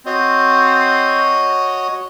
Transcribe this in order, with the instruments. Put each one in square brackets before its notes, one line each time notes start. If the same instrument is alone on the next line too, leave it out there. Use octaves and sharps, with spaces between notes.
[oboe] C4 [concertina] F#4 C#5 D#5